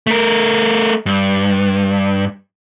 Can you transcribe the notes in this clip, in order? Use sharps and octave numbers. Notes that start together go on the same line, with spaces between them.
A3 A#4
G2